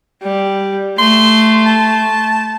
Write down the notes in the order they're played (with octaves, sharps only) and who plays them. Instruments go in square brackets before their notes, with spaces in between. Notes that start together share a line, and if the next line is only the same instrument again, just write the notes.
[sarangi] G3
[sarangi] A3 [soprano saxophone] C6
[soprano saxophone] A5